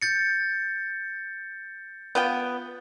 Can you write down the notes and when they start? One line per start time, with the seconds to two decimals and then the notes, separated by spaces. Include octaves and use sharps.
0.02 G6 A6 C#7
2.15 B3 F4 G5